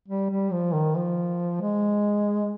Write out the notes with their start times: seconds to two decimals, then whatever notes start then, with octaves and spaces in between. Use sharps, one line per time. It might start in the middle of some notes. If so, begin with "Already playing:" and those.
0.08 G3
0.31 G3
0.52 F3
0.74 D#3
0.96 F3
1.61 G#3